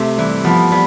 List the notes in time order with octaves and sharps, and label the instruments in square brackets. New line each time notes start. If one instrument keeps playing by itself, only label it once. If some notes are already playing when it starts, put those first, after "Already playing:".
Already playing: [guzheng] C3 [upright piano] A3
[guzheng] E3 [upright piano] G3
[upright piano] F3 [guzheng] B3
[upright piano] G3 [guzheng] B3